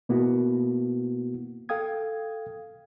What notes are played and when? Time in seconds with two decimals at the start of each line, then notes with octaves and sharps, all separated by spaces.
0.09 B2 A#3 B3 E4 F#4
1.69 A4 F5 G5 D#6 G#6